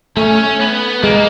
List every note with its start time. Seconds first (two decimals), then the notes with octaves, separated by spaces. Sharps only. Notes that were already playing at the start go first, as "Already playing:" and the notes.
0.17 A3 C#4
0.60 B3
1.03 G#3 A#3